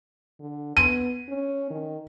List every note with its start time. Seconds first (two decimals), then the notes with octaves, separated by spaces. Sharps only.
0.40 D3
0.77 B3 D#7
1.29 C#4
1.70 D#3